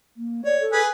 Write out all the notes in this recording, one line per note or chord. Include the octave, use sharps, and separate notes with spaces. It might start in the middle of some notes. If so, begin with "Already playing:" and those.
A#3
C#5 D5
A4
G#4 B4